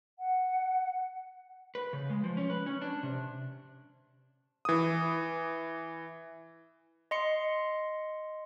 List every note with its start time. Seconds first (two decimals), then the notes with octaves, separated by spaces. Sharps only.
0.19 F#5
1.75 B4
1.93 C#3
2.10 G#3
2.24 F3
2.37 C#4
2.50 B4
2.66 C#4
2.81 D4
3.03 C3
4.65 E3 D#6
7.11 D#5 C6 C#7